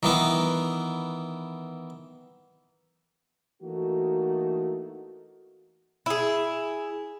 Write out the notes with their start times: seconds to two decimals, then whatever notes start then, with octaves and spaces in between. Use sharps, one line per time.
0.03 D#3 E3 B3
3.62 E3 A3 A#3 D#4 F#4
6.06 E4 G#4